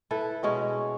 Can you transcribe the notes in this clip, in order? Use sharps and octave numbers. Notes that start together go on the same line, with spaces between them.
E4 A4 B4
B2 G#3 C#4